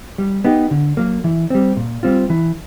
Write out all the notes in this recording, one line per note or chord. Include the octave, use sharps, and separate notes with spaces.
G3
B3 D#4 G4
D3
F#3 A#3
E3
G3 C4
A#2
G3 C4 F4
E3